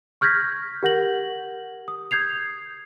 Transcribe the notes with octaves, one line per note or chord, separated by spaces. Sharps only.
C#6 F6 G6 G#6 A#6 B6
G4 A#4 F#5 G6 A#6 F#7
D#6
D#6 G6 G#6 C7 F7